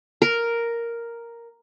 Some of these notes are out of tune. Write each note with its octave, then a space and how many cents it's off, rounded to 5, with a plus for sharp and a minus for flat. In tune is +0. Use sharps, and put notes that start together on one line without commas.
A#4 +0